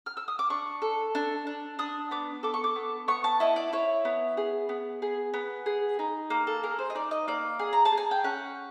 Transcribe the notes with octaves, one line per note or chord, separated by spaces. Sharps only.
F6
E6
D#6
D6
D4 C#6
A4
D4
D4
D4 D#6
B3 D6
A4 D6
C#6
D6
B3
B3 C#6
A5
E4 D#5
D5
E4 C#5
B3
G#4
B3
G#4
B3
G#4
D#4
A#3
A4
G#4 A#4
C5
D#5
D#4 D5
D#5
A#3 D5
G#4
A#5
A5
G#4
G#5
G5
C#4 F#5